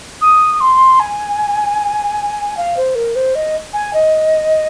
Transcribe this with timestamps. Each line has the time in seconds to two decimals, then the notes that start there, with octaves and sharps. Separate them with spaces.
0.22 D#6
0.61 C6
1.00 G#5
2.57 F5
2.77 C5
2.95 A#4
3.16 C5
3.35 D#5
3.73 G#5
3.94 D#5